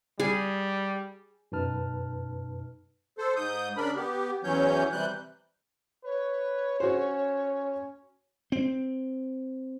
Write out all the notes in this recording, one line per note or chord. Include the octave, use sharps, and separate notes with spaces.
G3 G#4
F#2 B2 D#4 B4 A5 F6
A4 C5
G#2 D#6 G6
C#3 D4 A#4 B5
B3 G4
E2 E3 F#3 C#4 C#5 G6
C3 E3 G3 F#6 G6
B4 C#5
C#4 F#4 C5
C4